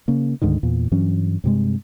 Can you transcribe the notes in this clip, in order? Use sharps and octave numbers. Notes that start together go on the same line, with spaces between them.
C#3 A#3
D2 G#2 D3 D#3
E2 A#2
G2 E3 F#3 C#4
G2 C3 G#3